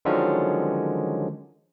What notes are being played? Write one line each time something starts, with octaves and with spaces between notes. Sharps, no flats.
D3 D#3 F3 F#3 G#3 C#4